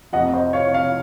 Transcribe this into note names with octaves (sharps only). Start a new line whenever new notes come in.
F1 F2 C3 F3 D#5 F#5
C5 D#5
C#5 F5
C#5 F5